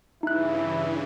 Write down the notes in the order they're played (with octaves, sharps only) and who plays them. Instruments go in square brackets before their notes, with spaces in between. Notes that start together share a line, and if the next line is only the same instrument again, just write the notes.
[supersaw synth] G2 C#3 E3 [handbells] D#4 F#6 [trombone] E4